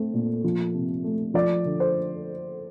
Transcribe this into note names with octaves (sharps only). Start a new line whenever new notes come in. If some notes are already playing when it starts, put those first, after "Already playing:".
Already playing: A3 C4
A#2
F3
C3
A3
F3 D5
D3
C5